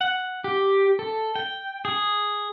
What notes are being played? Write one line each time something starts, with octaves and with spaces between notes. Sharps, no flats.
F#5
G4
A4
G5
G#4